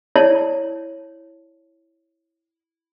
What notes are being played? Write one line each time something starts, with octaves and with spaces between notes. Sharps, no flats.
E4 C#5 D5 A5